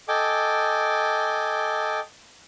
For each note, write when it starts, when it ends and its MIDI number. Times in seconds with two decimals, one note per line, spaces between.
0.08 2.00 69
0.08 2.00 75
0.08 2.00 79
0.08 2.00 80
0.08 2.00 86